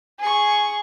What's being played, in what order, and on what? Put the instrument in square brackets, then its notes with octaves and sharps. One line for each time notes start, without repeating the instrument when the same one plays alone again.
[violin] G#4 C#6